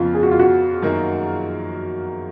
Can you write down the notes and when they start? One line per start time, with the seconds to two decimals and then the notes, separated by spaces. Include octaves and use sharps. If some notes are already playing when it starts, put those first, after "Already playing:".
Already playing: F2 C#3 F3 B3 F4
0.14 G#4
0.23 F#4
0.31 F4
0.39 F#4
0.82 F#2 D#3 A#3